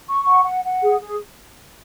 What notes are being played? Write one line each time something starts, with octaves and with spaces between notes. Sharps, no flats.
C#6
F#5
F#5
F#5
G#4
G#4